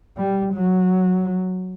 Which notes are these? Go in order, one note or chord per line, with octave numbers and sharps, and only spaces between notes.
G3
F#3